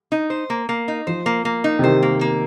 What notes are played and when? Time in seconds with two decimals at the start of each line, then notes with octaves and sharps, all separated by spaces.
0.12 D#4
0.30 C5
0.50 A#3
0.69 A#3
0.88 D#4
1.07 F3 C5
1.26 A#3
1.45 A#3
1.64 D#4
1.79 C3
1.84 D#3 C5
2.02 A#3
2.21 A#3